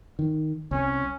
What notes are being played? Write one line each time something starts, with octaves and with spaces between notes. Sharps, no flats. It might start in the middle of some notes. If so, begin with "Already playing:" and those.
D#3
C2 C#4